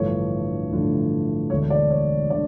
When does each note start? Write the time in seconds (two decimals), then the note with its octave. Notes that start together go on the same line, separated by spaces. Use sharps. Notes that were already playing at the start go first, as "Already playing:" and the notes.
Already playing: A1 G2 D3 F3 A3 C#5
0.71 A1 G2 D3 F3 A3
1.50 E1 D2 D3 A3 D4 C#5
1.70 D5
1.90 C#5
2.30 D3 A3 D4 D5